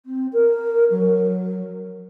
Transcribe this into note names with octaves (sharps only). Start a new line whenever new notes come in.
C4
A#4
F#3